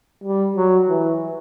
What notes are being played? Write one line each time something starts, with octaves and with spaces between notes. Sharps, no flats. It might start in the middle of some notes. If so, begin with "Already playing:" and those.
G3
F#3
E3